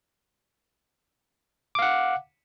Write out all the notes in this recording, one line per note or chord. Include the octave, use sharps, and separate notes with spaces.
F5 F#5 D6